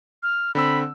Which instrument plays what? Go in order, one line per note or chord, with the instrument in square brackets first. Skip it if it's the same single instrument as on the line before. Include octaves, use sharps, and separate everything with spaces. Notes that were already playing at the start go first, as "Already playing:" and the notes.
[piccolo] F6
[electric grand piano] D3 C4 E6 [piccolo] B5